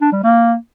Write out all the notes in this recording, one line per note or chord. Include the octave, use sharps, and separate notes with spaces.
D4
G3
A#3